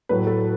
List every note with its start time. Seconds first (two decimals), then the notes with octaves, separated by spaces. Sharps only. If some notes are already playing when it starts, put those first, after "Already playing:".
0.09 A2 F#3 A3 B4
0.27 A4